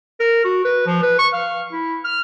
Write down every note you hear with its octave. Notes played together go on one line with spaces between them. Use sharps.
A#4
F#4
B4
F3
B4
C#6
F5
E4
F6